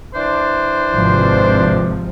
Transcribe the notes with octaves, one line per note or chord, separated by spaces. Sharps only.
E3 D4 C5
G#1 C3 F3